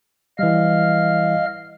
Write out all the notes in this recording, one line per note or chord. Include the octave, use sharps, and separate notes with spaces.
E3 G3 D#5 F5 F6